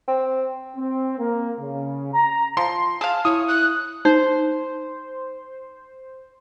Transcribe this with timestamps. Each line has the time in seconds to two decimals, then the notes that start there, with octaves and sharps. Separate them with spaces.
0.08 C4
0.76 C4
1.19 A#3
1.60 C#3
2.13 A#5
2.57 F3 C6
3.01 G#4 F5 A5
3.25 E4 C#5 D#6
3.48 F#6
4.05 D#4 C5